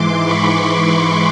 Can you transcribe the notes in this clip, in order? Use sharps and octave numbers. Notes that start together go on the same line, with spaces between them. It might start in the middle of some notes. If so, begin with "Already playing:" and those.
Already playing: G#2 E3 C6 D6
B5 C#6